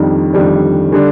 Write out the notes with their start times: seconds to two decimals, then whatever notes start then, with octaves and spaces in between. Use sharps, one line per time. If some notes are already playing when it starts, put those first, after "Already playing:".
Already playing: F2 D#3 G3 D4
0.33 F2 D#3 G3 D4
0.92 D3 G3 D4